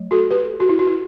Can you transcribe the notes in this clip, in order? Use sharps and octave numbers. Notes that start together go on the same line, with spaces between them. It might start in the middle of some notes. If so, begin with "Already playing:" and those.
Already playing: F#3 A3
F#4 A4
G4 B4
F#4
E4
F#4
E4